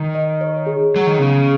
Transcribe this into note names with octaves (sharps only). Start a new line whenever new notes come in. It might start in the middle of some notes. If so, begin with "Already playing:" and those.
Already playing: D#3
D#5
C#5
G#4
F#3 G#4
D#3
C#3 B3